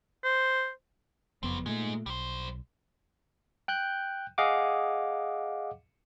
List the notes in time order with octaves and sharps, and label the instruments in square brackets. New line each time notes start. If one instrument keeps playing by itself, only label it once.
[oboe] C5
[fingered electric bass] F#1 F2 B3 [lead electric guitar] G3 C4
[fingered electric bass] A#2 A3 [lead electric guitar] G#3 D#4
[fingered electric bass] B1 [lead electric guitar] G3 C5
[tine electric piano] G5 F#6 G6
G#4 D#5 F5 F#5 D6